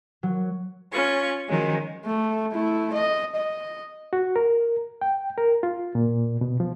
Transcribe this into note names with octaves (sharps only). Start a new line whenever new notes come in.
F#3
C#4 F4 C#6
D#3 F3 F#3 G#3 C#4
A3
A3 E4
D#5
D#5
F#4
A#4
G5
A#4
F4
A#2
B2
F3